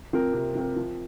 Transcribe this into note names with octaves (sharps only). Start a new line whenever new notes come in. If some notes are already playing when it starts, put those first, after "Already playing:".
F3 C4 A#4
C3
F3 C4 A#4
F3